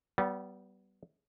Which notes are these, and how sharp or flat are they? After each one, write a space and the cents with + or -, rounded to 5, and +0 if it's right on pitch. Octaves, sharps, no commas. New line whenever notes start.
G3 -30 B3 +0